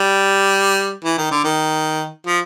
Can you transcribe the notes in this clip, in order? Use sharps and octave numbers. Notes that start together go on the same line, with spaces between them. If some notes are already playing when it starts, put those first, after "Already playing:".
Already playing: G3
E3
D#3
D3
D#3
F3